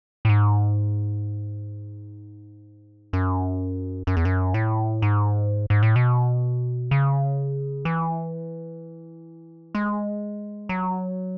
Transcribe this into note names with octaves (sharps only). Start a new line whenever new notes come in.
A2
G#2
F#2
F#2
E2
F#2
A2
G#2
G#2
A2
B2
C#3
E3
G#3
F#3